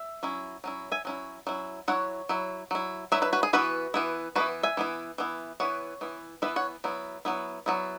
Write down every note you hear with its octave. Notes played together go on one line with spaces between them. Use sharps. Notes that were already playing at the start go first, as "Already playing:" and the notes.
Already playing: E5
F#3 C#4 E4
F#3 C#4 E4
E5 G#5
F#3 C#4 E4
F#3 C#4 E4
F#3 E4 C#5 F#5
F#3 E4
F#3 E4
F#3 E4 B4 E5
B4 E5
F#4 B4
G#4
E3 B3 E4 F#4 B4
E3 B3 E4
E3 B3 E4 F#4 B4
E5 G#5
E3 B3 E4
E3 B3 E4
E3 B3 E4 C#5 F#5
E3 B3 E4
E3 B3 E4 B4 E5
C#5 F#5
F#3 B3 E4
F#3 B3 E4
F#3 B3 E4